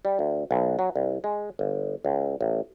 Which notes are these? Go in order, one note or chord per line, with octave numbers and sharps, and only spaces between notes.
G3
D2
B1
F#3
C2
G#3
G1
C#2
A1